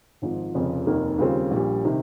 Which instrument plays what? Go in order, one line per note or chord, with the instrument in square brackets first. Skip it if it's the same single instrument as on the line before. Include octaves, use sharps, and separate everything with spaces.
[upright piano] G#1 G#2 F3
F1 F2 C#3 F3
F1 D#2 D#3 A#3 D#4
D#2 C#3 G3 C4 F4
A#1 A#2 G3
C3 D#3